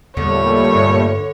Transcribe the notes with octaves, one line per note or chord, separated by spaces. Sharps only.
E2 A#2 D3 G3 A3 C#5
G2